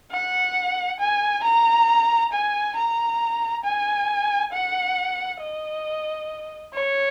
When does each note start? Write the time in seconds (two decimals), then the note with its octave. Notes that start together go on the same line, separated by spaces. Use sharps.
0.12 F#5
1.00 G#5
1.44 A#5
2.32 G#5
2.76 A#5
3.64 G#5
4.52 F#5
5.40 D#5
6.73 C#5